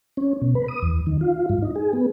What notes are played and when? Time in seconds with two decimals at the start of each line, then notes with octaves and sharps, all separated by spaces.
0.17 C#4
0.42 B2
0.55 B4
0.68 D#6
0.82 E2
1.07 D#3
1.21 F4
1.49 G#2
1.62 D#4
1.76 G#4
1.93 B3